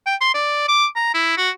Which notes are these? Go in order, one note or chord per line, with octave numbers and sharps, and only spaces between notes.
G5
C6
D5
D6
A#5
E4
F#4